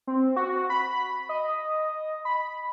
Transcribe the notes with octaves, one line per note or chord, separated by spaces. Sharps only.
C4
F#4
B5
D#5
B5